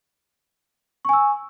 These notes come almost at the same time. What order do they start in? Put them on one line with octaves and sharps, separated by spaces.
C#6 G#5 E6